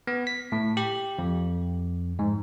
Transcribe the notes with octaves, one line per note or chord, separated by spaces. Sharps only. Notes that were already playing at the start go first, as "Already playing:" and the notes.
B3
B6
A2
G4
F2
G#2